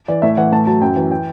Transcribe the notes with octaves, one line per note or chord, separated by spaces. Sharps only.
E3 D5
A2 E5
E3 F#5
A2 A5
F#3 A5
F#2 G5
E3
G5